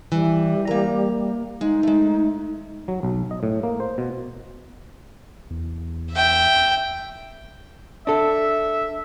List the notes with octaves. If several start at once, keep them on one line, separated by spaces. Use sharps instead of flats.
E3 G3
A#3 A#5
G#3 D#4
G#3 A3
F#3
B1
D#5
A2
A#3
C5
B2
E2
E5 G5
D4 A4 E5